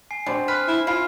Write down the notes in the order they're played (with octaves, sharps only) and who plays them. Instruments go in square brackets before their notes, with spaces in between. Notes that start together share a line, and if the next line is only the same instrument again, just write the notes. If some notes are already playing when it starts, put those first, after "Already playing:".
[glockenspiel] G#5 C7
[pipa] B2 [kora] C4 D4
[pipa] B4 [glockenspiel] F6
[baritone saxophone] E4
[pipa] E4 [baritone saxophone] F4